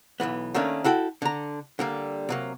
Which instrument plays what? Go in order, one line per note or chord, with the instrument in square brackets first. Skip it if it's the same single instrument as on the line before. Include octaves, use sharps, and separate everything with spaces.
[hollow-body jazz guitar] B1 F2 E3 B3
D#3 A3 A#3 C#4 D4
E4 F#4 A4 G5
D3 A#5
D3 G3 A#3
C3 F#3 A#3